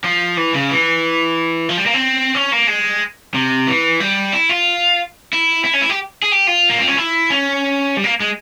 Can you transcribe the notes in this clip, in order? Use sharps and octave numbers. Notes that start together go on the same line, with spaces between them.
F3
E3
C#3
E3
F3
G3
A#3
C4
C#4
A#3
G#3
C3
E3
G3
E4
F4
E4
E4
C#4
E4
G4
G#4
G4
F4
A#3
C4
C#4
E4
C#4
G3
A#3
G#3